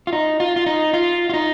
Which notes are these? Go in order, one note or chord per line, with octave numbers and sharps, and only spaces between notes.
F4
D#4
F4
F4
D#4
F4
F4
D#4